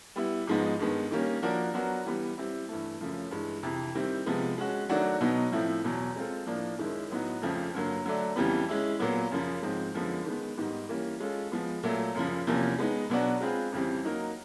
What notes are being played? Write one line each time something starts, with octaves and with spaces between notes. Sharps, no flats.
G3 B3 E4
G#2 F3 G#3 B3 D#4
G2 D#3 G#3 B3
D#3 G3 A#3 C#4
F3 A#3 D4 F#4 A#4
F#3 B3 D4 F#4 A#4
E3 G3 B3
G3 C4 E4
G2 E3 A3
F#2 C#3 F3 A3
G2 E3 G#3
F2 C3 E3
D#3 G3 C4 E4
C3 F3 G#3 B3
G#3 C#4 F#4
D#3 F#3 A3 D4 F#4
B2 F#3 B3 D#4
A2 F3 A3 C4 E4
E2 B2 F#3
G#3 C4 F4 A4
A2 F3 A#3 D4
F#2 D#3 G#3 C#4 E4
A2 F#3 B3 D#4 F#4
F2 C#3 F3 A3 C4
G2 D3 F#3 A#3
D3 F#3 A3 D4
F2 C#3 E3 G3 B3
G#3 C#4 E4
A#2 F#3 B3
F#2 C#3 F3
G#2 F3 G#3 C4
F#2 D3 F3 G#3 B3
D#3 G#3 B3
G#2 D#3 G3 B3 D#4
E3 G3 A#3 C#4
G#3 C#4 F4 A4
F3 G#3 B3
A#2 F#3 A3
F#2 C#3 F3
E2 C3 F3 A#3 C#4
G#3 B3 D#4
B2 F#3 B3 D4 F#4
G#3 C4 F4 G#4 B4
F2 C#3 E3 G3 C4
F#3 A#3 D#4 F#4 A#4